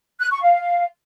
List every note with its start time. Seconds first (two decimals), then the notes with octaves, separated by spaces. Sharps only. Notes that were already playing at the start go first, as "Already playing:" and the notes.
0.20 F#6
0.31 C#6
0.42 F5